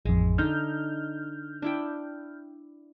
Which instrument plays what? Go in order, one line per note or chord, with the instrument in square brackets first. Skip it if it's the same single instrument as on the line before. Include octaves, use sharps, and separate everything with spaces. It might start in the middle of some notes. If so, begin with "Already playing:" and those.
[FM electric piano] A1 F2 [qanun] G#3
[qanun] D3 D#4 [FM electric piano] F6 G6
[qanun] D4 E4 G5